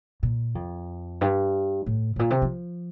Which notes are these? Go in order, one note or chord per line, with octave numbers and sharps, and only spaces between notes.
A#2
F2
G2
A2
A2
A#2
C3
F3